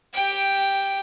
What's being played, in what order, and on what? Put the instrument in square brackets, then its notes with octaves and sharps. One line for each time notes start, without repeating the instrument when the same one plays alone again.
[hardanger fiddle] G4 G5